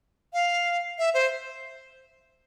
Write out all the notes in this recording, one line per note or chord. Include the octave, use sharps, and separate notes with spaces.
F5
E5
C5